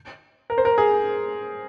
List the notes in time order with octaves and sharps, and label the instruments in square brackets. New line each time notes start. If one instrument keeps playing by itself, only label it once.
[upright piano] A#4
C5
A#4
G#4